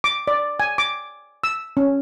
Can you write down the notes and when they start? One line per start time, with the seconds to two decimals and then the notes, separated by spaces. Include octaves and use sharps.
0.04 D6
0.28 D5
0.60 G#5
0.78 D6
1.44 E6
1.77 C#4